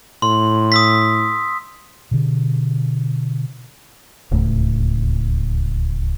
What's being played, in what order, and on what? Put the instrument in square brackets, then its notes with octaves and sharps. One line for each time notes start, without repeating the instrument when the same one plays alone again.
[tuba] A2 [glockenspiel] C6
[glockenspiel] D#6 E6 B6
[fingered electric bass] B2 D3
D1 C#2 A2